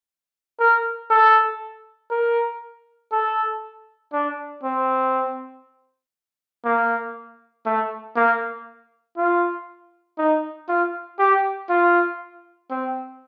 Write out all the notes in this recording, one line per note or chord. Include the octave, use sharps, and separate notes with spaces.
A#4
A4
A#4
A4
D4
C4
A#3
A3
A#3
F4
D#4
F4
G4
F4
C4